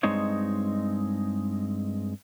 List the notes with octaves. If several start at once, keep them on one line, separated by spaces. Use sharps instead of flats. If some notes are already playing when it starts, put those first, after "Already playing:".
G2 G#3 C4 D#4 C#5